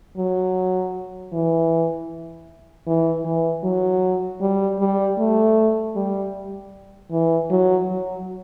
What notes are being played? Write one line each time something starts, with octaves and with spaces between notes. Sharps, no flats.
F#3
E3
E3
E3
F#3
G3
G3
A3
G3
E3
F#3
F#3